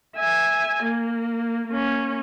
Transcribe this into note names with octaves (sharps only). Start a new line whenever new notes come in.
E5 G#5
A#3
A#3 C#4